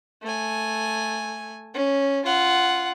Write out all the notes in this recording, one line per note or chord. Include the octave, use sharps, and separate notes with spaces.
A3 G#5
C#4
F4 F#5